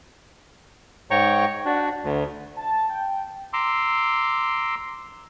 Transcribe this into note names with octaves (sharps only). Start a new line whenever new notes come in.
G#2 C#5 G5 A#5 C#6
D4 F#4
D2
A5
G5
A#5 C6 D6 E6